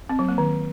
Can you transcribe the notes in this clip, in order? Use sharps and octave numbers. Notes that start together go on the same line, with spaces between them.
C4
F#3
A#3
D#3